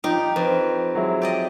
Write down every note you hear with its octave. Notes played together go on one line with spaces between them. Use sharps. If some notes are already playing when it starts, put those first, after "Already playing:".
F3 D#4 G4
F2 B4
F#3 G#3 E4
G4 D5 D#5